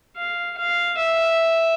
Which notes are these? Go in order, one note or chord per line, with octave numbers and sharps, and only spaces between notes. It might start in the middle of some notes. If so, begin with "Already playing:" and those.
F5
F5
E5